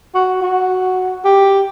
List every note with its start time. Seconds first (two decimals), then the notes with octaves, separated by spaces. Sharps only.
0.15 F#4
0.42 F#4
1.24 G4